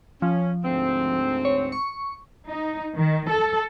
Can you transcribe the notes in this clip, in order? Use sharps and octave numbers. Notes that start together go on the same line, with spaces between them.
F3 C#4
D2 G#2 C4
C#5
C#6
D#4
D#3
A4